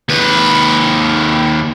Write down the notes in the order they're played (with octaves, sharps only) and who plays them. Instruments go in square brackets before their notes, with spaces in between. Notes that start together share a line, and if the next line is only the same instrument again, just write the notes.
[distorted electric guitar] D#2 B4